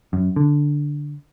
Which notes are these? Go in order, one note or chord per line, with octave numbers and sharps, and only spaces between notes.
F#2
D3